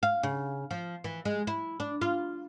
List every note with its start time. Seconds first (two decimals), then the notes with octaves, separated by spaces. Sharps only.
0.03 F5
0.23 C#3
0.71 F3
1.04 E3
1.25 G#3
1.47 E4
1.80 D4
2.01 F4